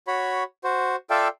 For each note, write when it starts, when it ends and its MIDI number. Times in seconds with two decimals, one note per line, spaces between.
0.07 0.43 66
0.07 0.43 73
0.07 0.43 83
0.64 0.96 66
0.64 0.96 72
1.10 1.28 65
1.10 1.28 69
1.10 1.28 74
1.10 1.28 76
1.10 1.28 77
1.10 1.28 79